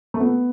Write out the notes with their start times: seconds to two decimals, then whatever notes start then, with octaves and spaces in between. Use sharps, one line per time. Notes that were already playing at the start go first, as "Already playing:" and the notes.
0.14 A3
0.20 B3